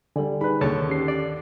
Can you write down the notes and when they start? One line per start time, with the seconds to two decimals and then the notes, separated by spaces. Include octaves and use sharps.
0.16 D3 G3 A4 D5 G#5
0.41 D#4 G#4 B4 B5
0.61 D#2 D3 A4 C#5 A5
0.88 C#4 G4 C7
1.08 D5